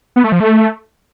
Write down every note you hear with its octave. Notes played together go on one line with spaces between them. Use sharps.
B3
A3
F3
A3